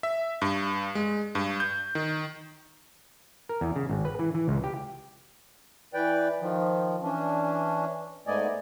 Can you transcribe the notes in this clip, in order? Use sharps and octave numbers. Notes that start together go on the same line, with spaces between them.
E5
G2
G#3
G2
G6
D#3
A#4
E2
C#3
G#1
B4
E3
E3
C#2
G4
E3 B4 D5 G5
D#3 F3
E3 C#4 D4
G#2 A3 B3 D5 D#5 G#5